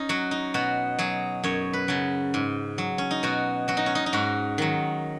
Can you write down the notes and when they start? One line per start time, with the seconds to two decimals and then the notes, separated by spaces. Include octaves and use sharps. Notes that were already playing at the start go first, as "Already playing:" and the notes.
Already playing: C#4 D#4
0.09 F#3 F#4
0.31 D#4
0.54 B2 F#4
0.99 F#3 G#4
1.44 F#2 C#5
1.73 B4
1.88 C#3 F#3
2.34 G#2
2.78 F#3
2.98 C#4
3.11 D#4
3.23 B2 F#4
3.68 F#3 F#4
3.77 D#4
3.86 C#4
3.95 D#4
4.06 D#4
4.13 G#2 F#4
4.58 D#3 F#3